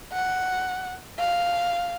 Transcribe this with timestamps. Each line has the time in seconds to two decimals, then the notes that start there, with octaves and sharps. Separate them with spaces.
0.13 F#5
1.19 F5